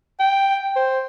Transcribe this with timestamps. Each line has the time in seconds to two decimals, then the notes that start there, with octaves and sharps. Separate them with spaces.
0.20 G5
0.76 C5